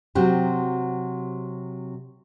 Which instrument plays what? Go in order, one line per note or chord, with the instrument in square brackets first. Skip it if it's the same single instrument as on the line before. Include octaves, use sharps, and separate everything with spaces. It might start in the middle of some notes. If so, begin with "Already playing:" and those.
[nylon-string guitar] C3 F#3 C4 F#4 G4